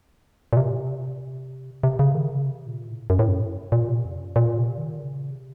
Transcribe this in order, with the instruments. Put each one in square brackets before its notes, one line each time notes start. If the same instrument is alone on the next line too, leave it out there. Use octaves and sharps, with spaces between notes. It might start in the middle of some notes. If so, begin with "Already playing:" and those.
[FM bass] A#2
C3
C3
C#3
D#3
C#3
C3
A#2
A2
F#2
A2
F#2
A#2
C3
F2
F#2
A#2
C3
D#3
C#3
C3